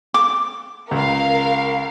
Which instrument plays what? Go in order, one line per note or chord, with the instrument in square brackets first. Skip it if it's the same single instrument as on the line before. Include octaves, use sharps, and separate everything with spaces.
[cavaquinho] D6
[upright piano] C#2 [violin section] A#4 F5